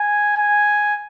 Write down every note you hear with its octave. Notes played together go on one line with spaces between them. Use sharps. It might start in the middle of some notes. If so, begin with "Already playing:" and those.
Already playing: G#5
G#5